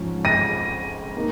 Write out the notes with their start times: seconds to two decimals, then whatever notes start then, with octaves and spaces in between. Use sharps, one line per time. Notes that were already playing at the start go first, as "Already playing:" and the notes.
Already playing: G#2 F3 C#4
0.25 A#6 D#7
1.17 A#3 D#4